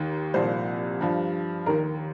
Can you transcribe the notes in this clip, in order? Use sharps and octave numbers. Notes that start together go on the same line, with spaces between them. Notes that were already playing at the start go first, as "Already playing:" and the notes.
Already playing: D#2 D#3
C2 A#2 F3 C5
G2 F3
D#2 D#3 A#4